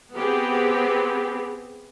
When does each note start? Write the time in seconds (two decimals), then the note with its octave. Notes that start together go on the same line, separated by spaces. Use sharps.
0.15 B3 C4 G4 G#4